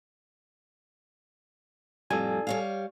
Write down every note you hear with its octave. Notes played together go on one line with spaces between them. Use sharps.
F2 A2 G3 A4 G#5
G3 C#5 F5